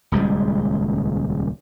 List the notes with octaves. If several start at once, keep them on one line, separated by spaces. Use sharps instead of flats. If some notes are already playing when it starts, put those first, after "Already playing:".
D#1 C#2 G3 G#3